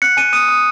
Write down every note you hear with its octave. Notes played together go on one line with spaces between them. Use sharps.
F#6 C#7
G#5 D#7
D#6 D#7
D#6